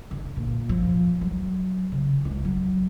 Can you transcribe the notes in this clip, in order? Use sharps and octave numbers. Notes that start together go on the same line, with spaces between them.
D3
A#2
F3
F#3
C#3
C#2
F#3